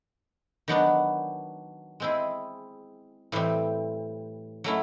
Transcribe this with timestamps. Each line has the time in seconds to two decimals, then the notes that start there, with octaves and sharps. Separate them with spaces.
0.68 D#3 F#3 B3 D4
2.00 G#3 C4 E4 G#4
3.32 A2 E3 G3 C4
4.64 F#3 A3 C#4 E4